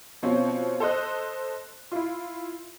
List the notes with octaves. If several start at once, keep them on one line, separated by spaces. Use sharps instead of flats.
B2 F3 C4 C#4
A4 C5 D#5 F#6
E4 F4